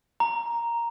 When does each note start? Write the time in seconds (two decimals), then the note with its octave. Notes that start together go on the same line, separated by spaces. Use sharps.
0.20 A#5